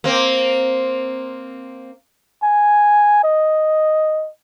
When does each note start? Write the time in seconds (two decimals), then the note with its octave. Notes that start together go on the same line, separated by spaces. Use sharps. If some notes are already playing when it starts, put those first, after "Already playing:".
0.04 A#3 C4
2.43 G#5
3.24 D#5